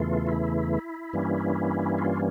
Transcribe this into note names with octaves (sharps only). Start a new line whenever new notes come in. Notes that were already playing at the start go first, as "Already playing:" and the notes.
Already playing: E2 C#3 E3 A3 F4
E4
G2 E3 G3 A#3 C#4
F4